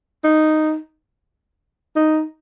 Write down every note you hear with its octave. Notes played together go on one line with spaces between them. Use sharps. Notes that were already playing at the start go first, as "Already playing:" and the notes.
D#4
D#4